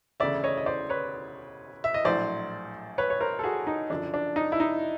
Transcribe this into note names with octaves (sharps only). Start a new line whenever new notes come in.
E1 D2 C#3 D5 E5
C#5 D#5
D#5
C5 D5
B4 C#5
E5
D#5
A#1 A2 F#3 C5 D5
B4 C#5
C#5
A#4 C5
A4
F#4 G#4
D#4
F#1 F#2 D3 F3 D4
D4
D#4
E4
D#4